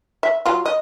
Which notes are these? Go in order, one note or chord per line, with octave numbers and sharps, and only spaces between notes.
E5
F#3 F4
D#5